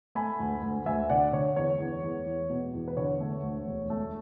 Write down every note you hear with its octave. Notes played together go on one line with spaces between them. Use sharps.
A3 G#5 B5
D2
D2
D2 E5 G#5
D3 D5 F#5
D3 C#5
E2 C#5
E2
E2
E2
B2
E2
B4
D3 C#5
A3
D2
E1
A3